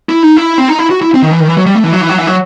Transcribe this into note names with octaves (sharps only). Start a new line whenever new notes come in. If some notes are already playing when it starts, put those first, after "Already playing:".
E4
D#4
E4
C4
D#4
E4
F#4
E4
C4
D#3
E3
D#3
E3
F#3
G3
A3
E3
F#3
E3
F#3
E3
F#3